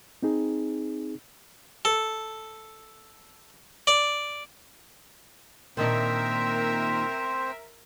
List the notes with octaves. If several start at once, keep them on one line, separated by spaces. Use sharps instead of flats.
C4 D#4 G#4
A4
D5
A#2 D#3 C4 D4 A#4 C5 E5